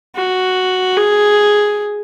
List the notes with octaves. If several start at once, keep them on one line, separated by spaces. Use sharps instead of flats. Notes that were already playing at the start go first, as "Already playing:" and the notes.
F#4
G#4